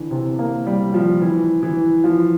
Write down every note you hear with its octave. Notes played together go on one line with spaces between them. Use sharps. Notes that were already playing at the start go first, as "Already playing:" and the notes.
Already playing: D3 E3
C3
A#3
G3
F3
E3
E3
F3